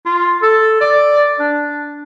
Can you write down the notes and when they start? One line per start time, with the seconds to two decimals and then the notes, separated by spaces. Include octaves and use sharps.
0.06 F4
0.43 A4
0.81 D5
1.40 D4